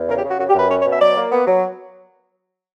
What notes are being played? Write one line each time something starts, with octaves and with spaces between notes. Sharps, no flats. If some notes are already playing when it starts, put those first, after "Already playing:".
Already playing: E2
C#3 A#4
G4
C#3 F#4
F#2 F#4
G4
F#2 B4
C#4 C#5
C#5
B2
E5
F#3 D5
A#3
B3
F#3